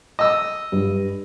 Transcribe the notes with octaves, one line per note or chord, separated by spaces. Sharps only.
D#5 E6
G2